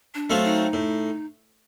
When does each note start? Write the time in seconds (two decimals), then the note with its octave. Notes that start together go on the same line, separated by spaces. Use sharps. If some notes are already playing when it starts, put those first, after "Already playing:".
0.15 D4
0.30 F#3 A3 C4 F4
0.44 D#4
0.73 A2